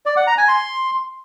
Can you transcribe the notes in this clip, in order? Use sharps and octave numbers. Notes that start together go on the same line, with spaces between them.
D5
F#5
A#5
G#5
C6